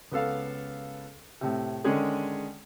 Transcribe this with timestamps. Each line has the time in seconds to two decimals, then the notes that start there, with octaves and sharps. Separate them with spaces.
0.12 C#2 B3 A4 F5
1.41 A2 C3
1.84 D3 D#3 G#3 C#4 G#4